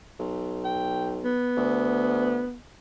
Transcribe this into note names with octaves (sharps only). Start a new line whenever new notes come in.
B1
G5
B3
D2